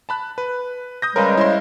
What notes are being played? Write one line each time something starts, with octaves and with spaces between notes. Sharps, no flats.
A5 B5 F#6
B4
D#6 G6 A#6
C#3 G3 G#3 A#4 B4 D#5
E4 C5 C6